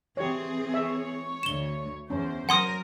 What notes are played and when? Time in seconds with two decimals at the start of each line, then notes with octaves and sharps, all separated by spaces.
0.17 E3 C4 G4 G#4 C#5
0.74 C#5 E5
1.43 D2 E7 G7
2.10 E2 C#4 C5
2.49 F#3 A#4 F#5 G#5 C6 D#6